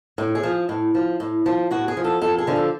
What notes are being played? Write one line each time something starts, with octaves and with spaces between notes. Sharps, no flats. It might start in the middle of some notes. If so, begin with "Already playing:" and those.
A2
G#4
F3
A2
F3
A2
F3
A2 F#4
G#4
F3
A4
F2 A4
G#4
D3 F3
A4